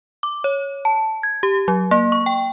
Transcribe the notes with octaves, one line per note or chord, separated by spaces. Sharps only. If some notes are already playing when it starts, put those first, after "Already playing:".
D6
C#5
A5
G#6
G4
F#3
A#3
C#6
G5